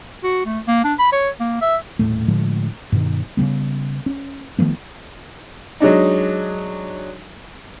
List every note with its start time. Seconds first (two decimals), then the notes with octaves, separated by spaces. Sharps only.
0.23 F#4
0.46 A3
0.68 A#3
0.84 D4
0.99 B5
1.12 C#5
1.40 A#3
1.61 E5
1.99 D#1 G#1 A2 A3
2.28 A2 D3 F3 G#3
2.92 G2 B2 D#3
3.37 C#3 F#3 G3 B3
4.06 C#4
4.59 D#3 F3 A3 B3
5.80 F#3 G#3 D4 D#4